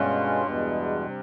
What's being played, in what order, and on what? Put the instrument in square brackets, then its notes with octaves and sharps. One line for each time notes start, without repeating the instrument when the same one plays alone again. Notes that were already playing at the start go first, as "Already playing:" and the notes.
Already playing: [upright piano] G2 [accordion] B2 G#3 C#4 F4
[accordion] E2 B2 G#3
C3